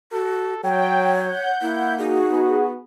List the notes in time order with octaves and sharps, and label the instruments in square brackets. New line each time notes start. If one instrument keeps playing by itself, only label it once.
[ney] F#4 [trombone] A4
[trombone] F#3 [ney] C#5 [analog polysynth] G5
[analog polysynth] F#5 G6
[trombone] A#3 [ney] E4
[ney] D#4 [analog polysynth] F#4 G#4
[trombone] B3